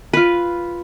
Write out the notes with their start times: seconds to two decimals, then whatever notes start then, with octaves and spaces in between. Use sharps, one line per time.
0.13 F4 B4